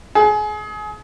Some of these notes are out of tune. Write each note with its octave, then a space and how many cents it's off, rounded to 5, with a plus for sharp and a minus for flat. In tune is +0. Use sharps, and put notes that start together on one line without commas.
G#4 +25